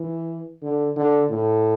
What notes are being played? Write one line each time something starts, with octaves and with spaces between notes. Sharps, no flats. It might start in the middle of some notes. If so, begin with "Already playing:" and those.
Already playing: E3
D3
D3
A2